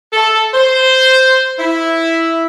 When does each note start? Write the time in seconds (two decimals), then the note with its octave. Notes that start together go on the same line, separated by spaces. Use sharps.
0.13 A4
0.54 C5
1.58 E4